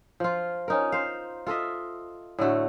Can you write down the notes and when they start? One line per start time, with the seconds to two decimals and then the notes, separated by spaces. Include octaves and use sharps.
0.20 F3 F4
0.68 C#4 D#4 A#4
0.92 C5 F5
1.47 F4 A4 D#5 E5
2.39 A2 D3 A3 F#4